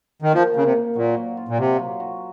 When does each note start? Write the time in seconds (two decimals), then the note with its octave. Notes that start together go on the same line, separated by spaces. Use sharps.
0.22 D#3
0.33 F3 A#3
0.54 C#3 A#3
0.64 C3
0.75 A#3
0.96 A#2 F#3
1.17 F#3
1.37 F4
1.48 A#2
1.58 C3 F#3
1.79 F#3
2.00 F#4